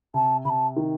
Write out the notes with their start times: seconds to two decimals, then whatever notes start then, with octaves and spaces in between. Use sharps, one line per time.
0.14 C3 A5
0.45 C3 A5 B5
0.77 D#3